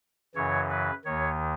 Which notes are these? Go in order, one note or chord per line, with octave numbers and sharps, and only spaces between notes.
F#2 C#3 E3 C#5
B4
D#2 D#3 C#5